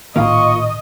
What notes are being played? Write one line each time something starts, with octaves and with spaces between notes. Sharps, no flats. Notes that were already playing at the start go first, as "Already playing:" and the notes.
A#1 A2 D#3 A#3 F4 D#5 F5 C#6